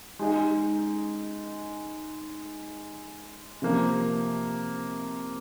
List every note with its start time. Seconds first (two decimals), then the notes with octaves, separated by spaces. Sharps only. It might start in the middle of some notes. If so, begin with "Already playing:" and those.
0.19 G#3 D#4 G#4 D#5
3.62 C3 F3 A#3